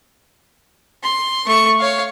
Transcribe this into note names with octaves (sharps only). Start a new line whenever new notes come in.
C6
A3 C#6
C#5 F5